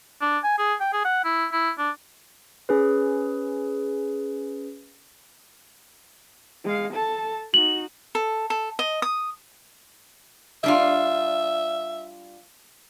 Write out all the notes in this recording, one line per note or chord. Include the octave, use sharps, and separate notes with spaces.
D4
G#5
G#4
G5
G#4
F#5
E4
E4
D4
C#4 G#4 B4
G#3 F5
A4 A5
D#4 F#4 F#7
A4
A4
D#5
D#6
G3 D4 F4 E5